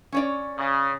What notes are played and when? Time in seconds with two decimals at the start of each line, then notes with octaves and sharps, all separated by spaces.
0.12 C#4 C#5 D5
0.58 C#3